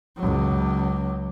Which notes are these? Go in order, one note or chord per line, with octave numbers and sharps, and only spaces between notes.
C#2 F#3